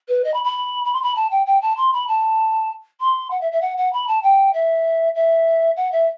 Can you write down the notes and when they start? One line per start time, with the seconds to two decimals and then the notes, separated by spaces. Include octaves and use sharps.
0.08 B4
0.24 D#5
0.34 B5
0.44 B5
0.85 B5
0.93 C6
1.03 B5
1.15 A5
1.31 G5
1.46 G5
1.62 A5
1.77 C6
1.93 B5
2.08 A5
3.01 C6
3.31 F#5
3.41 E5
3.52 E5
3.61 F#5
3.77 F#5
3.93 B5
4.08 A5
4.23 G5
4.54 E5
5.15 E5
5.77 F#5
5.92 E5